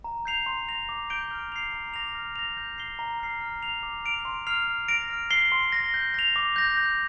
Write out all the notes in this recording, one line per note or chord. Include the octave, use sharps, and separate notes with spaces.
A#5
G6 C7 F7
C6
A#6 F7
D6
G6 D7 G7
F6
C7 F7
A#5
D6 A#6 F7
F6
A#6 F7
G6
C7 G7
A#5
F6 C7
F6
C7 F7
D6
F6 D7 F7
C6
F6 C7 F7
F6
A#6 D7 F7
F6
C7 G7
C6
A#6 G7
G6
A#6 F7
D6
G6 A#6
G6